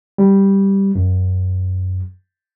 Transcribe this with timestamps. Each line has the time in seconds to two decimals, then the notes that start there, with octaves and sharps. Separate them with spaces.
0.18 G3
0.95 F#2